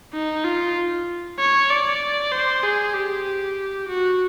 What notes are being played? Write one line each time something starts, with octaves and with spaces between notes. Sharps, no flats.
D#4
F4
C#5
D5
C5
G#4
G4
F#4